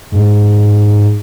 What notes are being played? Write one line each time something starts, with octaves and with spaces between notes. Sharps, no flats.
G#2